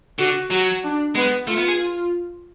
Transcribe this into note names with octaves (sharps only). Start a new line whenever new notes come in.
D3 F#4
F#3 F#4
D4
G#3 B3
A3 F4
B3
G#4
F4